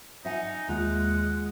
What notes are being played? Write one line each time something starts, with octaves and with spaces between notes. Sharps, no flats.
D#4 E5 F#5 G#5
D#2 G#3 F4 F#5